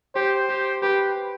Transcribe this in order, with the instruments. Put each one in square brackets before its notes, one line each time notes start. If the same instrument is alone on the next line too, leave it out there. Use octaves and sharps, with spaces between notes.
[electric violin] G4 [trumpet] C5
[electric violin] G4
[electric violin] G4 [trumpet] B4